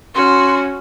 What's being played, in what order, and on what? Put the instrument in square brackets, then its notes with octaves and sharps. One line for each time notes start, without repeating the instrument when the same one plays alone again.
[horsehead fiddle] C#4 [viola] F#4 [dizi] C6